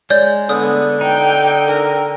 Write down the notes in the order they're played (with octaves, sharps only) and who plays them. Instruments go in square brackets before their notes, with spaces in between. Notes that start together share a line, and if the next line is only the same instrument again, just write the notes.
[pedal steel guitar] G#3 G6 [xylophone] C#5 D5
[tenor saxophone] D3 [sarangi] B3 [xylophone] D#6
[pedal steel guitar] D#4 [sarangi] G5
[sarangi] A#4 [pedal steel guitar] G5